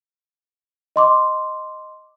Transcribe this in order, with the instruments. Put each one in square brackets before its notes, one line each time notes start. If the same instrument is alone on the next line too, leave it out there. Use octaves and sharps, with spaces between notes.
[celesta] D#5 C6 D6